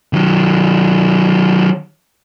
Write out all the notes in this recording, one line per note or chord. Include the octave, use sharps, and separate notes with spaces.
D#3 F#3